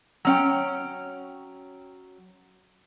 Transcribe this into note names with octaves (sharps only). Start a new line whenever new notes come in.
F#3 C#4 G5